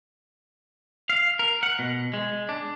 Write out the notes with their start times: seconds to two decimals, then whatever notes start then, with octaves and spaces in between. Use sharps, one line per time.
1.10 F5
1.39 A#4
1.63 F#5
1.79 B2
2.14 G#3
2.49 D4